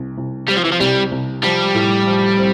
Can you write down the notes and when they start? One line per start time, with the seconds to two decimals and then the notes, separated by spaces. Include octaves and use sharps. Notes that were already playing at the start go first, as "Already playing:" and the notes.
Already playing: C2
0.18 C2
0.49 G3 C4
0.57 F3
0.65 E3
0.72 F3
0.80 C2 G3
1.12 C2
1.43 F3 G3
1.74 A2
2.06 F3
2.38 C4